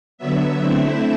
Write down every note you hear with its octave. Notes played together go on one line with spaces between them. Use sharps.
D3 F#3 B3 E5
D3 A3 C4 E4